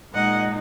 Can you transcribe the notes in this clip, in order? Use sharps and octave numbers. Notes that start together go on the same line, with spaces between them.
A#2 G#3 D#4 D#5 F#5